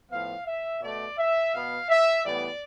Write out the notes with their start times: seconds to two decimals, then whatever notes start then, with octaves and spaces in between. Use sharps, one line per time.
0.10 A2 F3 B3 F5
0.47 E5
0.81 B2 A3 D5
1.18 E5
1.53 B2 B3 F5
1.89 E5
2.24 A2 E3 G3 B3 D5